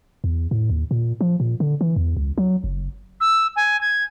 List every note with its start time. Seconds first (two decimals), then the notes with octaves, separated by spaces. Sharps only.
0.24 E2
0.51 A2
0.70 D#2
0.91 A#2
1.21 F3
1.40 A#2
1.60 D3
1.81 E3
1.96 E2
2.17 C#2
2.38 F#3
2.64 F#1
3.21 E6
3.56 G#5
3.81 G#6